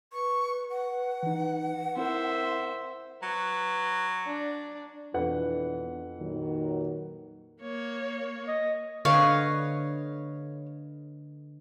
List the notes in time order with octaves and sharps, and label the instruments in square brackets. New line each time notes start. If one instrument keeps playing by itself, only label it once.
[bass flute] B4 [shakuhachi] C#6
[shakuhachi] F#5
[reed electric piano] E3 D#4
[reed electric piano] C4 E4 A#4 [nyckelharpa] C5 E5
[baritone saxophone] F#3 [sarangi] B4
[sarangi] D4
[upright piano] F2 B4 F#5 [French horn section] B2 E3 D4
[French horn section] A#2 D#3 F#3
[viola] A#3 C#5
[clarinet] D#5
[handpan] D3 B4 D#5 [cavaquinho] C#5 F5